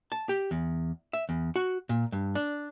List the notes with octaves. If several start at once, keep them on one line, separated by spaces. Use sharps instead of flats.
A5
G4
E2
E5
E2
F#4
A#2
G2
D4